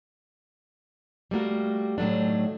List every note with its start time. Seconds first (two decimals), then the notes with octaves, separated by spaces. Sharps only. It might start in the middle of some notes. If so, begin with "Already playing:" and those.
1.31 G3 A3 A#3 F#4
1.98 A2 D#3 F#3 A3 D4